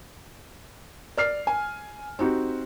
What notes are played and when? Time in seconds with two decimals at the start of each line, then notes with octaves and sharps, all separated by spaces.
1.17 D5 F6 C7
1.47 G#5
2.19 C4 D#4 F#4 G4